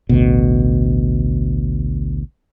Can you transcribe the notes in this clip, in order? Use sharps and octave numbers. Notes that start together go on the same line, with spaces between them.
A1 D2 B2